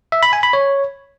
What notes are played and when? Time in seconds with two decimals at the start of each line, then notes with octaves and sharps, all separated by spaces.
0.12 E5
0.23 B5
0.33 G#5
0.43 B5
0.53 C#5